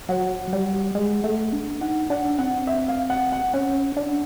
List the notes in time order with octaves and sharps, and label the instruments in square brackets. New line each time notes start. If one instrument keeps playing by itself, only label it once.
[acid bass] F#3 [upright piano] F#5
[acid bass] G3
G#3
A3
D4
[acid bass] D#4 [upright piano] F#5
[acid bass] D4 [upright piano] F#5
[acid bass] C4 [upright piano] F#5
[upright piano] E5
F5
F#5
F#5
[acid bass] C#4 [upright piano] F#5
[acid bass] D4